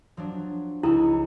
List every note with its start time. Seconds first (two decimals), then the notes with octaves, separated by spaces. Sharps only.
0.17 F3 F#3 D4
0.83 C#2 D#4 E4 C#6